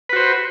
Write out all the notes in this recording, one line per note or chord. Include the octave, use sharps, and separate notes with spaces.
F#4 B4 C5